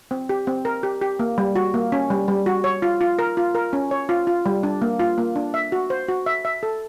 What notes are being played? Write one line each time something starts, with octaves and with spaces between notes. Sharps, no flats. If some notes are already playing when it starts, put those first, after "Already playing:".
C4
G4
C4
A#4
G4
G4
A#3
G3
F#4
A#3
C#4
G3
G3
F#4
C#5
F4
F4
A#4
F4
A#4
C#4
C#5
F4
F4
G3
D4
A#3
F4
A#3
D4
E5
F#4
C5
F#4
E5
E5
A4